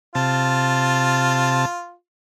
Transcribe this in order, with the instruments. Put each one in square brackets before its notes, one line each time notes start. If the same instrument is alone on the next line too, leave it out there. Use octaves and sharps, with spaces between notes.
[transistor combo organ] C3 A5 [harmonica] F4